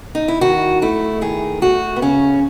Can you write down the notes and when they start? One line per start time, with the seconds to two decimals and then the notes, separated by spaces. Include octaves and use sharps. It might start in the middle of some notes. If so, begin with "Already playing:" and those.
0.15 D#4
0.28 E4
0.41 D#3 F#4
0.82 A3 E4
1.21 D#3 G#4
1.61 A3 F#4
1.96 B3
2.02 C#3 C#4